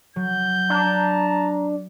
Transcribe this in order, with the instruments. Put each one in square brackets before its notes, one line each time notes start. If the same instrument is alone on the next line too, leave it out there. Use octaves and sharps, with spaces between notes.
[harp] F#3 [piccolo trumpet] G6
[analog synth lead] D4 [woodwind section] A5 A#5